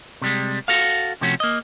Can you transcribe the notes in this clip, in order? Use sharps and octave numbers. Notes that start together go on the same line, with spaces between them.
C3 G3 G#3
F#4 A4 F5
C3 F3 A3 C#4 F#4
A#3 D#5